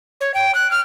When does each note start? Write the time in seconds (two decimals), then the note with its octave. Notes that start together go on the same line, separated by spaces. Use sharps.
0.21 C#5
0.34 G5
0.55 F#6
0.71 F6